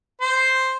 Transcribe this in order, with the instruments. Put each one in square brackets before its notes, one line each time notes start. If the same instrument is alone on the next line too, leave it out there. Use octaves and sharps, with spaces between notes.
[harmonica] C5